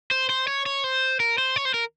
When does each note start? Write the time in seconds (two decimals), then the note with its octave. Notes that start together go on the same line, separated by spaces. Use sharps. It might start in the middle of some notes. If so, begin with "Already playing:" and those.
0.11 C5
0.29 C5
0.47 C#5
0.66 C#5
0.84 C5
1.20 A#4
1.38 C5
1.56 C#5
1.65 C5
1.74 A#4